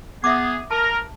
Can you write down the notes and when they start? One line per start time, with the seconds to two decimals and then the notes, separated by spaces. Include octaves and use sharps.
0.24 B3 G#4 E5 D6
0.71 A#4 A5